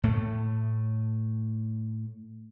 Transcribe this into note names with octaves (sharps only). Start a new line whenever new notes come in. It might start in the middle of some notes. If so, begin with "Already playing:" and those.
A2 A3